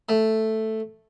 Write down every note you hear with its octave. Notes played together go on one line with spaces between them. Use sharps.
A3